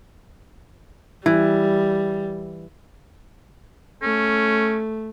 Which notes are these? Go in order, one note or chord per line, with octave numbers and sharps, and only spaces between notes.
E3 G3
A3 C#4